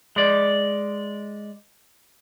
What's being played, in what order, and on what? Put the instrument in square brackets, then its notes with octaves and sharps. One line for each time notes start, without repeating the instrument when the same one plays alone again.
[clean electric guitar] G#3 D5